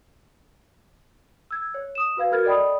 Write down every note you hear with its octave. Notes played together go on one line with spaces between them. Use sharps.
E6 G#6
C#5
D#6 E7
F#4 B4 F5 G#6
F#4 A#4 F6 G#6 A6
A4 D5 D#5 G5 B5 D#6